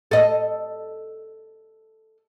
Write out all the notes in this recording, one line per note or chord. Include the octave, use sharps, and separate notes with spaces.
A4 D#5